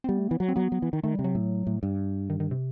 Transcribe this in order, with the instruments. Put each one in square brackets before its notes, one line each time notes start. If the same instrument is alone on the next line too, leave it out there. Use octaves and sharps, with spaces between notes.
[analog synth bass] C4
[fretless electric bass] G3 [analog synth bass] B3
[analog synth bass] A3
[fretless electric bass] E3 [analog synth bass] B3
[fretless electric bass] F#3
[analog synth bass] C4
[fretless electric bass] F#3 [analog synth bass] B3
[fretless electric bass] F#3
E3
D#3
[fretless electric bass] D#3 [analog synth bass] A3
[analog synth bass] G3
[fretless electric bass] C3
[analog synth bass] F#3
[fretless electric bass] A2
A2
G2
[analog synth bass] D#3
D#3
C3